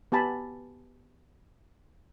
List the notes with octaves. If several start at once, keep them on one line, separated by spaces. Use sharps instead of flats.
B3 G4 G#5 A5 B5